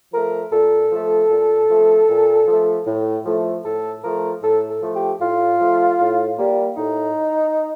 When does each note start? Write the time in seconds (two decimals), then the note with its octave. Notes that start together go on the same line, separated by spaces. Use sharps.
0.13 F3 A3 A#4
0.52 A#2 A4
0.92 F3 A3
1.30 A#2
1.69 F3 A3
2.09 A#2
2.48 F3 A3
2.87 A2
3.26 F3 A3
3.64 A2 A4
4.03 F3 A3 A#4
4.42 A2 A4
4.69 A4
4.82 F3 A3
4.95 G4
5.21 A2 F4
5.60 F3 A3
5.99 A2
6.38 G3 A#3
6.77 A2 D#4